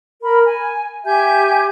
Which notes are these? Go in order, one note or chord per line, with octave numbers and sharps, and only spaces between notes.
A#4 B5
G#5
G4 E5 G#5 G6